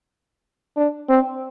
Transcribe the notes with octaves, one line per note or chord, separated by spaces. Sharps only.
D4
C4